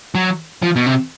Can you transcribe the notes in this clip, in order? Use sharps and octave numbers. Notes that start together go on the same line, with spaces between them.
F#3
F3
B2
C3